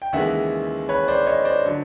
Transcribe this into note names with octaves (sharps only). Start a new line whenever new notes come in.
G5
D#2 C#3 E3 G#3 E5 F#5
B4 C#5
C5 D5
C#5 D#5
C5 D5
D3 F#3